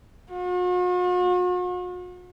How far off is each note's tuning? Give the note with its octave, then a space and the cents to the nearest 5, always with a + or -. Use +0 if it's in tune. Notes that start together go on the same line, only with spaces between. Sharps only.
F#4 -45